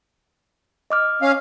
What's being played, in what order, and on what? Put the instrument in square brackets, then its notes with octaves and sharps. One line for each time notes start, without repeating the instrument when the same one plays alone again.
[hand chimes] D#5 D6 F6
[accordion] C#4 F5